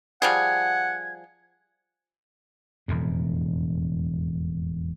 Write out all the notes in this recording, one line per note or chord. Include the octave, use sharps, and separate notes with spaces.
F3 G3 G#4 F#5 G#6
E1 F2 A2